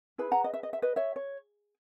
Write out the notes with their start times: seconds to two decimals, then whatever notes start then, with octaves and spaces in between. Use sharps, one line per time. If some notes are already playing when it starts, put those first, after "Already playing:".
0.18 E4 G#4 B4 B5
0.31 F#5 A#5
0.44 D#5
0.54 E5
0.63 D#5
0.73 E5
0.82 B4 D#5
0.96 C#5 E5
1.16 C#5